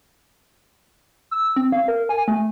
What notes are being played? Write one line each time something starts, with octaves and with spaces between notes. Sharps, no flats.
E6
C4
F5
A#4
G#5
A3